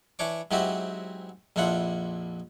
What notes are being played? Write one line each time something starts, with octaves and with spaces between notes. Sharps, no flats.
E3 D4 C#5 D6
G#2 F#3 C4 E4 F#4 G4
A#1 F2 D4 E4 F4 F#5